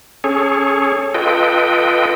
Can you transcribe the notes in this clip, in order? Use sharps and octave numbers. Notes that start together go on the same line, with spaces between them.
C#4 G#4 A4 C#5
F4 A4 B4 D#5 G5